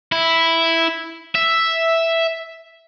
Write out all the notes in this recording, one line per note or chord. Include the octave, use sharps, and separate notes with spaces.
E4
E5